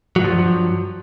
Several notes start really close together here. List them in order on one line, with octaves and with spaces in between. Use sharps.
F#3 G2 F3